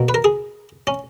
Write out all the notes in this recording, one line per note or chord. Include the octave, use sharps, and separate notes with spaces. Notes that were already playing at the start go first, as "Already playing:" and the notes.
Already playing: B2 A#3
B4
A#4
G#4
C#4